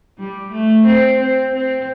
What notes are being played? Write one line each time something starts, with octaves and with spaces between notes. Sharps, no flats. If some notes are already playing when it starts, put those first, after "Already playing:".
G3
A3
C4
C4
C4